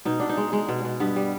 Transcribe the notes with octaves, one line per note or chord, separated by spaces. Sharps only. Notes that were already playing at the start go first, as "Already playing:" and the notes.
B2 D#4
B2 D4
D#4
G#3
G#3
B2
B2
G2 B3
G3